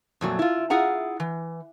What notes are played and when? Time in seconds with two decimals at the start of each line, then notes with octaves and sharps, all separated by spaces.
0.21 F2 A#2 F#3 A3
0.39 E4 F4
0.70 E4 F4 G#4 F#5 A#5
1.20 E3